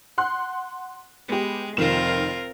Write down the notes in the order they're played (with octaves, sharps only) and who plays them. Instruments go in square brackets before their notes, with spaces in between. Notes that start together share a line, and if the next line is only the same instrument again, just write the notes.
[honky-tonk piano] F#5 C6 F#6
[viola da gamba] G#3 [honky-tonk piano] B3 G4
[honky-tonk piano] F1 D#3 E7 [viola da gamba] C4 F4 A#4